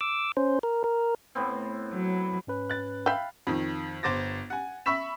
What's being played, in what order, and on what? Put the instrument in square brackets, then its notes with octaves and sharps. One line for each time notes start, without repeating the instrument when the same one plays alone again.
[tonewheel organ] D6 E6
C#4 C5
A#4
A#4
[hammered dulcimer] A2 B3 C4
[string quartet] F#3
[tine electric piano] G#2 C#4 B4
[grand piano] F#6 A6
[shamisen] E5 G5 [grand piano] F5 B5
[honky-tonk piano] F2 D#3
G1 C5 D6 A6 A#6
F#5 G#5
E5 B5 C#6 E6 B6 E7